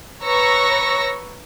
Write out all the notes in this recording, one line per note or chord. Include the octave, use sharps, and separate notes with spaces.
B4 C#5 A#5 C#6 E6 A#6